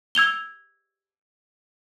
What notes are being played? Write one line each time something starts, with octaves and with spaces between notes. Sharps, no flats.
E6 G#6 F7 G7